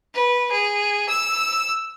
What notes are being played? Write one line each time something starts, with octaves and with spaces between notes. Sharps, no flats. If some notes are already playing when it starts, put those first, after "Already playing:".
B4
G#4
E6